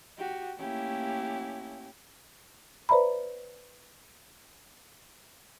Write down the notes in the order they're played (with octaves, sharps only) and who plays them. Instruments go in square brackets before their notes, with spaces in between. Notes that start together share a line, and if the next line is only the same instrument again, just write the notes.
[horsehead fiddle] F#4 G4
[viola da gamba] A3 A#3 E4 [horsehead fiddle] C#4 G4
[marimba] B4 C5 D5 E5 A#5 B5